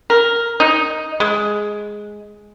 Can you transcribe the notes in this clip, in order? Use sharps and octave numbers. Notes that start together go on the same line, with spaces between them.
A#4
D#4
G#3